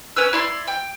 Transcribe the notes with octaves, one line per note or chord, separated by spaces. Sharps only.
C#4 B4 E6
E4 D5 C6
G5